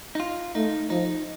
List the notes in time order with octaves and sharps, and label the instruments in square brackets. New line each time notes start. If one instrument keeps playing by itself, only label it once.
[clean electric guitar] D#4
F4
[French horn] A3 [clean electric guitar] D#4
[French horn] F3 [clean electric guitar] D#4